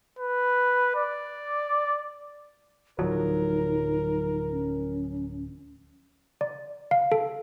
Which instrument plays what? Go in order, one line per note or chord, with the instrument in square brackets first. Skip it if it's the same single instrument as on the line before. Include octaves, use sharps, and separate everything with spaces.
[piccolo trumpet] B4
D5
[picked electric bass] D1 F3 F#3 [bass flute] D#4 [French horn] A#4
[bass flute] C#4
[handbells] D5
F5
A4